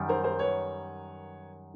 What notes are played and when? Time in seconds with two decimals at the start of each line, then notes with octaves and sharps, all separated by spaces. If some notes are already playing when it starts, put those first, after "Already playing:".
Already playing: F#2 D#3 G3
0.09 A#4 C5
0.24 A#4 C5
0.39 B4 C#5